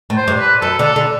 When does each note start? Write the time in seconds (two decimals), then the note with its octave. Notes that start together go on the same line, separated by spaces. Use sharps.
0.10 A2
0.16 C5
0.28 G2
0.39 B4
0.61 F#2 A4
0.79 D3
0.84 A4
0.96 D3